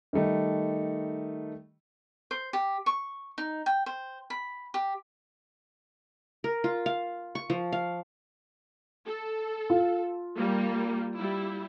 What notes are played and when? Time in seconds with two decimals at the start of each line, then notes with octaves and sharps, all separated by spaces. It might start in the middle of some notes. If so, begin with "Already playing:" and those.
0.13 D#3 G3 A3 D#4
2.31 C5
2.53 G4
2.86 C#6
3.38 D#4
3.66 G5
3.86 C5
4.30 B5
4.74 G4
6.44 A#4
6.64 F4
6.86 F5
7.35 C#6
7.50 F3
7.72 F5
9.07 A4
9.70 F4
10.37 G3 A#3
11.16 G3 E4